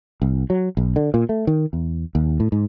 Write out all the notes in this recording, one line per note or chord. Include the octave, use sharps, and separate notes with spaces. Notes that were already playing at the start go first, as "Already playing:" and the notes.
C2
F#3
B1
D3
A#2
A3
D#3
E2
D#2
A2
G#2